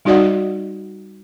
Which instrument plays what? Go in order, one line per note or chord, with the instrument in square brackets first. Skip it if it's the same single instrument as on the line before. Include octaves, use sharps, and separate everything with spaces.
[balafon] G3 D#4 F#4 D5 D#5 F#5